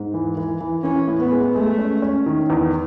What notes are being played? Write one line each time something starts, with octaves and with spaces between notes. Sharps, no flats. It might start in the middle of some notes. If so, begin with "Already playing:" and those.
Already playing: G#2
E3
E3
E3
E3 C#4
A2
B3
G#3
G#3 A3
C#4
C#4
D#3
E2